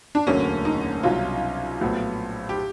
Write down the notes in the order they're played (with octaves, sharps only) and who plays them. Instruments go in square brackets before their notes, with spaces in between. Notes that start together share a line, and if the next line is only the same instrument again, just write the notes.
[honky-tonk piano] D4
[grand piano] E1 D2 D3 F#3 A#3 [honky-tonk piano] C#4
[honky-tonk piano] D#4
[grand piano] C2 B2 F#3 [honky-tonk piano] F4
[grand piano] A#1 A2 F#3 B3
[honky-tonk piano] G4